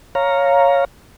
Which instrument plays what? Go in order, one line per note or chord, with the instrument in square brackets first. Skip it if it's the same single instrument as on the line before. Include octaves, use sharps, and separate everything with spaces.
[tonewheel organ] C#5 F5 A#5